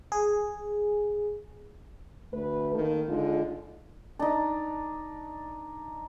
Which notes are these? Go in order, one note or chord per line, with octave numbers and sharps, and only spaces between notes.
G#4
D2 A3 B4
D#3 A#3 A4
D3 G#3 D#4 F4
D4 D#4